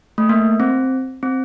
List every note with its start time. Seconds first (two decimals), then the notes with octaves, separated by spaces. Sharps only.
0.18 A3
0.29 A#3
0.60 C4
1.23 C4